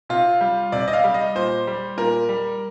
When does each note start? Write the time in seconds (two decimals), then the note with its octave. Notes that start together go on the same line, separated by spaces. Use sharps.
0.09 C3 F4
0.41 G3
0.72 C3 D5
0.88 D#5
0.93 F5
1.04 G3
1.14 D#5
1.35 A#2 C5
1.67 G3
1.97 A#2 A#4
2.29 G3